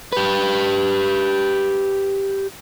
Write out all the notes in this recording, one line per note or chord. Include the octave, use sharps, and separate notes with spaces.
G4 B4